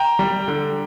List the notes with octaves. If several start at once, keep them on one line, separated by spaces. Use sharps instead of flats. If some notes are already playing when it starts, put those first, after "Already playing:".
Already playing: G5 A#5
G3
D3